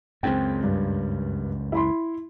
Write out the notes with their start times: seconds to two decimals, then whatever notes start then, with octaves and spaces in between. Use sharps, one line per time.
0.23 C#2 F#2 C4 G#4 G5
0.63 G2
1.72 E4 B5 C6